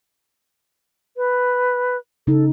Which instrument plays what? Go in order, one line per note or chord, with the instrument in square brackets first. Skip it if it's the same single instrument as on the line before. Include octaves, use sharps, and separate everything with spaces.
[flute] B4
[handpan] C#3 D#4 [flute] A4